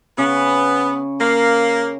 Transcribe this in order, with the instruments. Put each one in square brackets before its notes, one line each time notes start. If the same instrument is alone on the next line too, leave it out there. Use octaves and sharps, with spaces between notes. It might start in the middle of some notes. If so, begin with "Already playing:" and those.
[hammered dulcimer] C#3 [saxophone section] B3
[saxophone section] A#3